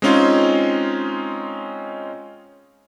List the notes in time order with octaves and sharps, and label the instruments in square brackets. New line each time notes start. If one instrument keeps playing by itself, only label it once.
[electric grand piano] G#3 C4 C#4 D#4 F4